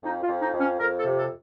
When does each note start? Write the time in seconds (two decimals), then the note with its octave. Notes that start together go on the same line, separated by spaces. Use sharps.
0.03 F2 D#4
0.22 F4
0.29 F2
0.41 D#4
0.54 F2
0.60 C#4
0.79 F2 A#4
0.98 A4
1.05 C3
1.18 A4